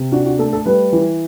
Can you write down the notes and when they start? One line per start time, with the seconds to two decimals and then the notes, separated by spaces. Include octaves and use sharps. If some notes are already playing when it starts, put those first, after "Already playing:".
Already playing: C3
0.12 D4 F#4
0.26 F#4
0.39 A3 A4
0.53 A4
0.66 G3 B4
0.92 E3